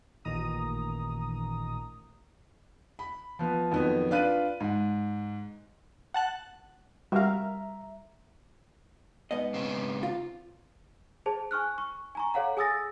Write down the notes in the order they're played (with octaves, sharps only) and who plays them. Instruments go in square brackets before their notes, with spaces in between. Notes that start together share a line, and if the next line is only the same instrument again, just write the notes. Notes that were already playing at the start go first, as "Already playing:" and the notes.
[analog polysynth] A1 A#2 D#3 A#5 D#6
[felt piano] B5
F3 B3
F2 D#3 F#3 B3
D4 F4 B4 F#6 D#7
G#2
[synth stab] F#5 A5 F#6
[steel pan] G3 [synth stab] F#4 A#4 F5 [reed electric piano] E5 A#5
[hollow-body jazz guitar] G#2 B3 D#5
[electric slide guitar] C#3 C4
[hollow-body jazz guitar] F4
[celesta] G#4 C5 A5
G#5 C#6 F6 F#6
C#6
G#5 A#5 C#6
A4 C#5 F5 F#5 A#5
G#4 G#5 D#6 E6 A6 A#6